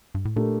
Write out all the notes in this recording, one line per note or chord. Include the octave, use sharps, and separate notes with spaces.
G2
A2
A#2 A3 D4 G4 A#4